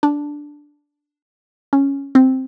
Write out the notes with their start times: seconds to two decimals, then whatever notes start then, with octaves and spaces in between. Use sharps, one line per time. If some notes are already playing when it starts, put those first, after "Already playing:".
0.03 D4
1.73 C#4
2.15 C4